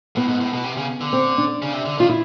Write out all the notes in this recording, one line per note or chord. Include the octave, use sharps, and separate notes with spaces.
A2 B3
G#2
A2
B2
C3
C#3
D3
C4
D4
C#3
C3
D3
D#3 F4
E4